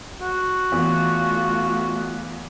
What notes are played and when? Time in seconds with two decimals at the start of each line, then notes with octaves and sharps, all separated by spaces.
0.20 F#4
0.72 E2 A3 F4